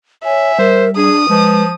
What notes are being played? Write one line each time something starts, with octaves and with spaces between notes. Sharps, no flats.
C#5 E5 G#5
G3 A#4 C5
D4 G#4 D#6
F3 G#3 B4